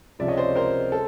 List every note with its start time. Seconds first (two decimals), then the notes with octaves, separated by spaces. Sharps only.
0.19 C#2 C3 F3 D5 E5
0.28 C#5 D#5
0.37 C5 D5
0.55 A#4 C5
0.92 A4